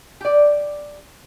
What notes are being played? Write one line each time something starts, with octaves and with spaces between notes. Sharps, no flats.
G4 D5